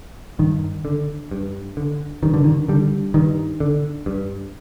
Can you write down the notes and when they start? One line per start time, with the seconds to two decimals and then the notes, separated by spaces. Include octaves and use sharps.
0.39 G2 D#3
0.85 D3
1.31 G2
1.77 D3
2.23 G2 D#3
2.34 D3
2.44 D#3
2.68 D3 G3
3.14 G2 D#3
3.60 D3
4.06 G2